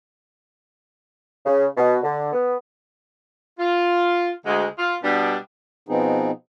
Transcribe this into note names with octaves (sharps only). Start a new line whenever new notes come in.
C#3
B2
D3
B3
F4
D2 G#3
F4
B2 G3 B3 D4
B2 F3 B3 C4 D#4 G#4